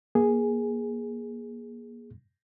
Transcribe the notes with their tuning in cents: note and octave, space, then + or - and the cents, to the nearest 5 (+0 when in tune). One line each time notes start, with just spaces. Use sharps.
A#3 +30 G#4 +0